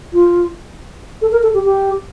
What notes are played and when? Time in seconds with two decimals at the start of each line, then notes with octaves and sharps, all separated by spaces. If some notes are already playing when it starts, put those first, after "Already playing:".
0.13 F4
1.22 A4
1.32 A#4
1.43 A4
1.54 G4
1.64 G4